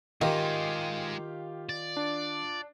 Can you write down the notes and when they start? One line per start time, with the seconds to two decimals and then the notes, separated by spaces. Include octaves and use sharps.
0.21 D#3 G#3 D#4 F4 G4 F5
1.69 D5
1.97 D4